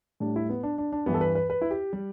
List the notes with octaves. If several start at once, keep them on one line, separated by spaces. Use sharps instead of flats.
A2 G3 D4
E4
B3
D4
D4
D4
G2 E3 G3 B3
A4
B4
B4
B4
E4
G4
G3